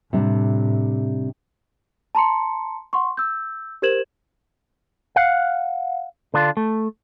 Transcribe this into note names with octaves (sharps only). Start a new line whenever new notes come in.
A2 C3 G3 D4
A5 A#5 C6 C#7
F#5 C6 C#6
E6 G6
G4 A#4 C5 G#6 E7 F#7
F5 F#5
D3 D4 F4
A3